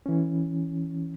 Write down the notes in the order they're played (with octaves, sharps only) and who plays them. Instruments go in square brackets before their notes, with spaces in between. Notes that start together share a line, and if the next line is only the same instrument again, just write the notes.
[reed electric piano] E3 C#4